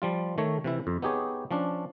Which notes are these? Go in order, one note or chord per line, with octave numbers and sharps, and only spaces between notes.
F3 G3 F4
D#3 A3 C#5
C3 E3 E4
F2
B3 D#4 G4 G#4 C#5
F3 C#4 D4